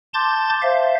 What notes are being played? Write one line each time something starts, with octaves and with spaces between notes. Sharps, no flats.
A5 C6 D6 G6 A6
C5 E5 F5